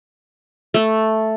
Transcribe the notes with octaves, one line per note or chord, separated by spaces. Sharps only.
A3 A4